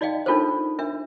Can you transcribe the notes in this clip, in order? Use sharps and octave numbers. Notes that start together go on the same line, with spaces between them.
D#4 D5 D#5 F5 G5
D4 D#4 F4 A4 A#4 C5
D4 A#4 E5